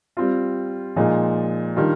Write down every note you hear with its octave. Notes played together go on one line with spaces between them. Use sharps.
G3 C4 F4
A#2 F3 G#3 D#4
D#3 G3 D4 F4